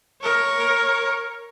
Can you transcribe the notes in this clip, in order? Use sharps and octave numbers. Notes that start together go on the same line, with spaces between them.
A#4 C#5